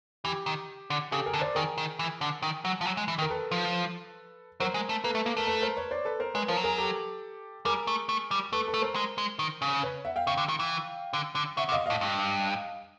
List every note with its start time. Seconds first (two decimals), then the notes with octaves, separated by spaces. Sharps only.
0.24 E3 G4
0.46 D#3
0.90 D3
1.11 C#3 G4 A4
1.26 G#4 A#4
1.33 D3
1.41 C5 D5
1.55 D#3 G#4 A#4
1.78 D#3
1.99 E3
2.21 D3
2.42 D#3
2.65 F#3
2.81 F3
2.86 F#3
2.97 G#3
3.08 E3
3.18 D#3
3.22 A#4
3.30 A4 B4
3.51 F3
4.60 F#3 A#4 C5
4.74 G#3
4.89 A3
5.04 A#3 A4 B4
5.15 A3
5.26 A#3
5.37 A3 A#4
5.47 A4 B4
5.62 A#4 C5
5.77 B4 C#5
5.91 C5 D5
6.05 A4 B4
6.20 A#4 C5
6.35 G#3 B4 C#5
6.48 F3 A#4 C5
6.57 F#3
6.64 G#4 A#4
6.78 G4 A4
7.65 G3 G#4 A#4
7.87 A3
8.09 A3
8.31 G3
8.52 A3 A4 B4
8.67 A4 B4
8.74 A3
8.81 A#4 C5
8.95 G#3
9.18 G#3
9.39 D#3
9.62 C#3
9.83 B4 C#5
10.05 E5 F#5
10.16 F5 G5
10.27 C#3 F5 G5
10.38 D3
10.49 D#3
10.59 E3
11.13 D3
11.35 D3
11.57 C#3 E5 F#5
11.69 C3
11.72 D#5 F5
11.86 A2 D#5 F5
12.01 G2